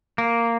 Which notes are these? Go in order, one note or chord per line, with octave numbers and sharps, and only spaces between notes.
A#3